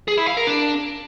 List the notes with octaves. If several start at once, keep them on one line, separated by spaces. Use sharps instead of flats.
G#4
E4
F5
A#4
D4